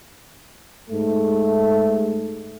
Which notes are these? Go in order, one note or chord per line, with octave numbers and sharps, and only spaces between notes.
G#2 A3